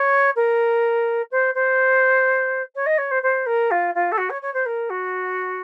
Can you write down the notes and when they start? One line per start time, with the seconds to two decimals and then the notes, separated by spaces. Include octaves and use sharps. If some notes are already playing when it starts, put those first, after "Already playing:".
Already playing: C#5
0.36 A#4
1.31 C5
1.54 C5
2.75 C#5
2.86 D#5
2.98 C#5
3.11 C5
3.22 C5
3.46 A#4
3.70 F4
3.94 F4
4.11 A4
4.17 F#4
4.29 C#5
4.41 C#5
4.53 C5
4.65 A#4
4.89 F#4